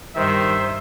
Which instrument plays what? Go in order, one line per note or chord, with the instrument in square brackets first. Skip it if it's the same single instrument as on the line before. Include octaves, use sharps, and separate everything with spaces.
[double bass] G2 G3 [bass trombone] D#3 [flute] C5 [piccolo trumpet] E5